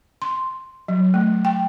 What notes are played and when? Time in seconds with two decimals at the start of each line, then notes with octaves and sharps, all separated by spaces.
0.22 C6
0.88 F#3
1.14 A3
1.45 G5